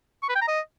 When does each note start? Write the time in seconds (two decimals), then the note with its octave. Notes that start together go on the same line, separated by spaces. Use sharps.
0.23 C#6
0.29 B4
0.35 G5
0.42 A#5
0.48 D#5